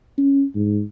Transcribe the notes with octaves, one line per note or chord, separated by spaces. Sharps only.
C#4
G#2